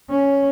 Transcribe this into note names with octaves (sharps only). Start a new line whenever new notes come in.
C#4